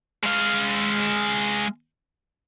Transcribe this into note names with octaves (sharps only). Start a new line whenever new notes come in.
G#3 F5